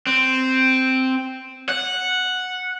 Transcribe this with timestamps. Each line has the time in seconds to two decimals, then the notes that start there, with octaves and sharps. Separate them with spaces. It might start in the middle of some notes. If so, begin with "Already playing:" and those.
0.07 C4
1.69 F#5